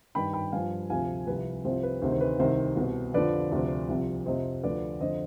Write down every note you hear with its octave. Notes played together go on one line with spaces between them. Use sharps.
G2 D#3 G5 B5
G5 B5
G2 F3 F5 G#5
D2 C3 F3 F5 G#5
C2 C3 F3 B4
C2 C3 F3 C5
B4
D2 C3 D#3 C5
C5
B4
C2 C3 D#3 C5
C2 B2
F2 D3 F3 B4 D5
D2 C3 F3
C2 C3 F3
F2 C3 F3 C5 D#5
D2 D3 F3 B4 D5
F2 D3 F3 C5 D#5